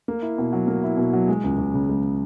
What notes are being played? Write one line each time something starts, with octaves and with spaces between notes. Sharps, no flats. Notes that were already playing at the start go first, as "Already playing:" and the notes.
A#3
E4
B2
F#3
A#3
E4
B2
F#3
G#3
C#2
C#2
C#3
G#3